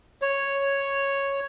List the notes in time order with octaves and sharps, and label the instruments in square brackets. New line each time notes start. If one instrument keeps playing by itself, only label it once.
[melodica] C#5